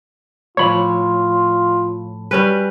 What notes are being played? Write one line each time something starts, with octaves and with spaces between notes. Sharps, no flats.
A2 F3 F4 C#5 B5
G3 C#4 B4